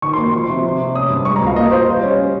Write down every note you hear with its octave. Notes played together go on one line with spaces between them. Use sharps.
D#3 C#6
A#3 C6
F3 C6
C3
C3
C4
C#4 D#6
G2
G#3 C#6
A#5
C#2
F5
A#3 D#5
F4 C5
G3
C#4